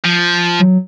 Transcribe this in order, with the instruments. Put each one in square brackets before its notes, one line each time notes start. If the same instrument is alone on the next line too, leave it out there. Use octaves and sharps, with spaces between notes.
[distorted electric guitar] F3
[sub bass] F#3